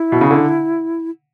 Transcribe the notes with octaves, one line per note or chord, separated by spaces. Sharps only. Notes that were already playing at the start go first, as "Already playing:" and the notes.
Already playing: E4
B2
C#3
D3